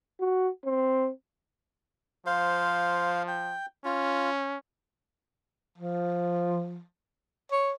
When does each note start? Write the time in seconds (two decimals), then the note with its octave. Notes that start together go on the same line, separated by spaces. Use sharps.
0.20 F#4
0.65 C4
2.26 F3 C5 F5
3.28 G5
3.85 C#4 F4
5.78 F3
7.52 C#5